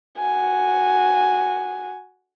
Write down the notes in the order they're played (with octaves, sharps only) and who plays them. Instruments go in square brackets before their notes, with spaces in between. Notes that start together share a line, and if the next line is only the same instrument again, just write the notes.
[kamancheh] F#4 G#5